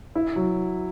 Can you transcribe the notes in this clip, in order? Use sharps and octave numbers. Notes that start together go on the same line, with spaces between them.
E4
F#3